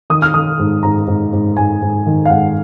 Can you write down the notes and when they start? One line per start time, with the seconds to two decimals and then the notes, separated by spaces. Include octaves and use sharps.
0.10 D#3 D#6
0.22 F6
0.34 D#3 D#6
0.59 G#2
0.83 G#2 A#5
1.07 G#2
1.33 G#2
1.57 G#2 G#5
1.82 G#2
2.06 D#3
2.25 F5
2.30 G#2 F#5